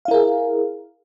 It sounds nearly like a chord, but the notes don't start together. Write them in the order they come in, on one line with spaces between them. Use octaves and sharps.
F5 E4 A#4 G#4